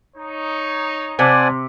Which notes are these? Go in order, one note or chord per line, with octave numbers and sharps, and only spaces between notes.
D#4 C#5
C3 C5 D5 F#5 G#5 A5 D6